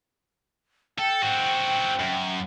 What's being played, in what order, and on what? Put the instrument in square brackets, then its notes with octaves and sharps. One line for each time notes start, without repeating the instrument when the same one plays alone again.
[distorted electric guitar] A4 [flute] G5
[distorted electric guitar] C4 F#4
F#2